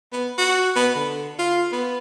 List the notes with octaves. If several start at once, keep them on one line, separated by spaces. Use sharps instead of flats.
B3
F#4
B3
D3
F4
B3